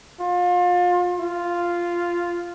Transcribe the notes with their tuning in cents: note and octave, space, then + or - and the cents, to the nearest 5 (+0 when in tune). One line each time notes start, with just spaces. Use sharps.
F4 +30
F4 -5